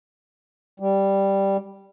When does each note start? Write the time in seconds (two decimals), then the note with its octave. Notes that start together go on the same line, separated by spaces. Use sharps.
0.80 G3